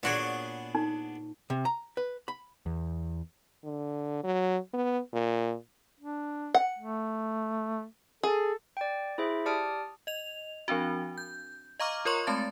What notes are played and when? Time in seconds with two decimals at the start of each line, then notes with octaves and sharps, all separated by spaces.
0.03 A#2 B3 D4 F#4 G#4 C#5
0.75 D#4
1.50 C3
1.65 A#5
1.97 B4
2.28 B5
2.66 E2
3.64 D3
4.24 F#3
4.73 B3
5.13 A#2
6.00 D4
6.54 F#5
6.79 A3
8.23 G#4 A4
8.77 D5 G5
9.18 E4 G#4 C5 E5
9.46 G4 D5 A5 D#6 F6 D7
10.07 D#5 F7
10.68 F3 C4 D4 F#4
11.18 G6
11.80 D#5 F5 A#5 C#6 D6 F6
12.05 F4 A#4 C#5 C6 C#6
12.27 G#3 A3 C4 A5 A6